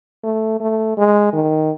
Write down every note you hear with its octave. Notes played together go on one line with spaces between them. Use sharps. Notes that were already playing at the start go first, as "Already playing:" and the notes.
A3
A3
G#3
D#3